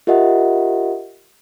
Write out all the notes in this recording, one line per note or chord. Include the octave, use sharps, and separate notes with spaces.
F4 G4 A#4 D#5 E5 F#5